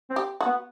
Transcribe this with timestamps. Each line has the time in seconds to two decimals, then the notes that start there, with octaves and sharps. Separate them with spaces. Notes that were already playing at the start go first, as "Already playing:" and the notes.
0.10 C4
0.16 G4
0.41 F#4
0.46 B3